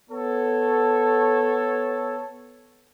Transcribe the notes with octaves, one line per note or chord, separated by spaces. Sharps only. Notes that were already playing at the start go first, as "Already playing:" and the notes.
B3 A4 C#5